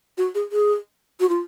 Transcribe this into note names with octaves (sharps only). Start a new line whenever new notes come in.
F#4
G#4
G#4
F#4
F4